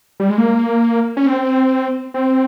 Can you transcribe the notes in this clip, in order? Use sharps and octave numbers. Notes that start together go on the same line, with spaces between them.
G3
G#3
A#3
C#4
C4
C4